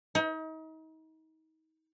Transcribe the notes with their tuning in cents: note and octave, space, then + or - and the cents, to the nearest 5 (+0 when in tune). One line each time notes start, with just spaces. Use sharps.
D#4 +35